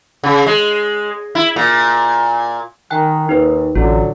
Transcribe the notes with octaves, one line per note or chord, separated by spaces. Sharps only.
C#3
G#3
E4
A#2
D#3 G5 G#5 F#6
D#2 D#4 B4
A1 D3 F#3 F4